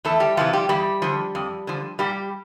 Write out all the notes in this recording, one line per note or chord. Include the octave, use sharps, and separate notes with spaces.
E2 A3 A4
G3 G4
C3 E3 F3 F4
G3 G4
E2 G3 G4
D3 F3
F2
D3 F3
A#2 G3 G4